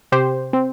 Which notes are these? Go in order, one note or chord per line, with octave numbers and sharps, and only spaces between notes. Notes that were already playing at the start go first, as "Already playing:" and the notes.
C3 G4 C5
C4